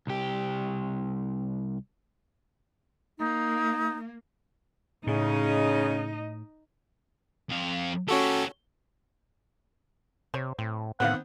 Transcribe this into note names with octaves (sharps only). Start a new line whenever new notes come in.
C2 G4
A#3 D#4
A2 C#3 D#4 D#5
F2 F5
C#4 F#4 G4 A4 C#5
C3 C5 C#5
A2 C4
A2 D#3 B3 C4 B4 D5 F5 F#5